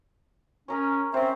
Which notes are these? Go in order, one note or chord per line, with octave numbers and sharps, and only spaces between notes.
C#4 G#4 A#4 C#5
C4 C#4 C5 E5